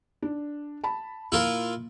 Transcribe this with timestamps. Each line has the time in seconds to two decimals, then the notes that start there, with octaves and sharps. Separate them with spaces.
0.22 D4
0.84 A5 B5
1.32 A#2 E4 F4 A#4